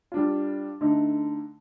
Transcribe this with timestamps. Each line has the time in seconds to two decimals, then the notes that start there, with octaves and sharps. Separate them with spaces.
0.12 G3 D4 F4
0.81 D3 A3 D#4